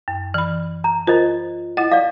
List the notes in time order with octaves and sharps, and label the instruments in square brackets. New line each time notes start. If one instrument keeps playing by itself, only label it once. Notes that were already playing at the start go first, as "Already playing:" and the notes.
[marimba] F#2
E3 B5
[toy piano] A#5
[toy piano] F4 C5 D#5 [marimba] A#4
[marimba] E4 F#5 [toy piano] D#5
[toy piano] D5 F5